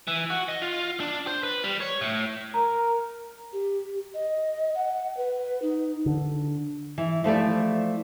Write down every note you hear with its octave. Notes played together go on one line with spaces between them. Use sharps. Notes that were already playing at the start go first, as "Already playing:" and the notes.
E3
F#4
D#5
F4
D4
C5
B4
G3
C#5
A2
A#4 A#5
G4
D#5
F#5
B4
D#4
D3
E3
F3 A3 E4 D5